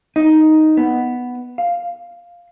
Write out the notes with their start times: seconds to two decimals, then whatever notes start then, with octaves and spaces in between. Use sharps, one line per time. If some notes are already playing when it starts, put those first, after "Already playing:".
0.16 D#4
0.77 B3
1.58 F5